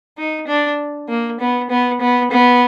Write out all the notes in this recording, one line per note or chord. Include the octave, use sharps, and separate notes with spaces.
D#4
D4
A#3
B3
B3
B3
B3